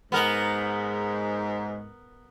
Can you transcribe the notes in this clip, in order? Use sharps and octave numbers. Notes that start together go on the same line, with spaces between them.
G#2 B3 A#4